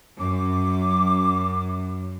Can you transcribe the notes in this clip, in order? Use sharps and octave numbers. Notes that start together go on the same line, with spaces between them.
F#2 D6